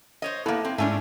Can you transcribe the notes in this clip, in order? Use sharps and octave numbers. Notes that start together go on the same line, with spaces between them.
C5 C#5 D#5
A#3 B3 E4 A4
C4
G#2 A3 C#4 D4